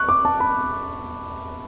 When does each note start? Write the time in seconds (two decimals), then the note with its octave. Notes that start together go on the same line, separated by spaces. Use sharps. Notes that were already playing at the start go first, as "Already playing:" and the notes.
Already playing: C#6 F#6
0.09 D6
0.25 A5
0.40 B5